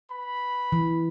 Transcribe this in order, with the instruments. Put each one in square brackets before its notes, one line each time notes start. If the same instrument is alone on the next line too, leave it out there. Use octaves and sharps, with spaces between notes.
[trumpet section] B4 B5
[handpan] E3